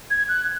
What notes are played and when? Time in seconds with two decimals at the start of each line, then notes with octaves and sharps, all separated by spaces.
0.10 G#6
0.28 F#6